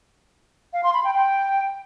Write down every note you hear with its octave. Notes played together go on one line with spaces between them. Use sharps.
F5
C6
B5
G5
G5